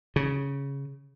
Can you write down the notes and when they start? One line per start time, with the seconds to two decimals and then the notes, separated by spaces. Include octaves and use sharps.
0.16 C#3